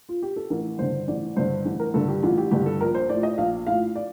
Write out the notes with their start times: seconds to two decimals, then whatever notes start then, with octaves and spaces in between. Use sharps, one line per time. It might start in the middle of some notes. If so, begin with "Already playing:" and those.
0.09 F4
0.22 G4
0.36 A4
0.50 A1 A#4
0.79 G2 D3 C5
1.08 A1 D5
1.36 G2 D3 C5
1.65 A1
1.80 A#4
1.94 G2 D3 A4
2.08 G4
2.23 A1 F4
2.37 G4
2.51 G2 D3 G4
2.66 A4
2.81 A#1 A#4
2.95 C5
3.09 A2 F3 D5
3.23 D#5
3.38 A#1 F5
3.67 A2 F3 F5
3.96 D5